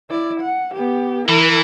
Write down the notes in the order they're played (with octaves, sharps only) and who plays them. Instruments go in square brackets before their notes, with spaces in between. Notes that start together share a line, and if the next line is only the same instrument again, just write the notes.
[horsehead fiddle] E4 D5
F#5
B3 G4
[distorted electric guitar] E3 [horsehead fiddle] E4 A#4